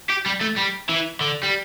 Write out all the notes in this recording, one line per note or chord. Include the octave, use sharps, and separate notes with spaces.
G4
G3
A3
G3
E3
D3
G3